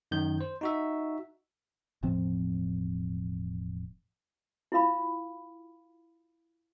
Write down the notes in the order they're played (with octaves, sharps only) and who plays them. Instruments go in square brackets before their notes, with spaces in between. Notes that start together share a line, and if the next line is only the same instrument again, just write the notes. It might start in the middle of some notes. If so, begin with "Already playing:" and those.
[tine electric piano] F#2 D#3 G6
C5
D#4 F#4 E5
[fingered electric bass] E1 A2 F3 C4
[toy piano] E4 F4 F5 B5